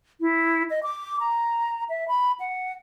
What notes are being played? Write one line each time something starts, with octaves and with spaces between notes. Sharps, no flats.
E4
D#5
D6
A#5
E5
B5
F#5